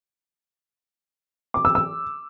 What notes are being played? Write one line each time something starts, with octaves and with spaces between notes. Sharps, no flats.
D6
E6
E6